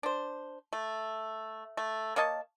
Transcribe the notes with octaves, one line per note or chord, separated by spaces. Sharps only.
D4 C5
A3
A3
A#3 C#5 D#5 A5